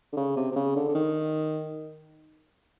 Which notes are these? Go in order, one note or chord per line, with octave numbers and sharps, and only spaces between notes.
D3
C#3
C3
C3
C#3
D3
D3
D#3